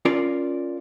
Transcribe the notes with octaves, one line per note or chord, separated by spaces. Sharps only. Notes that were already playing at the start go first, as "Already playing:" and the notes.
C#4 F4 A#4 D5